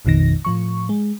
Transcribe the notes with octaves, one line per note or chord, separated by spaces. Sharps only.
A#1 F2 B2 D#3 A#6
A2 F3 C#6
G#3